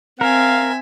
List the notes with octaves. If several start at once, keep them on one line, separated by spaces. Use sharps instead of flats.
C4 A#4 E5 F5 G#5